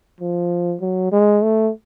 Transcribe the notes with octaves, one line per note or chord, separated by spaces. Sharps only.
F3
F#3
G#3
A3